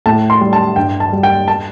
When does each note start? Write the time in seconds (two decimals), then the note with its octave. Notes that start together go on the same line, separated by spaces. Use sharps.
0.06 A2 A5
0.30 C6
0.41 G3
0.53 A5
0.76 G2 G5
1.00 A5
1.13 G3
1.23 G5
1.48 A5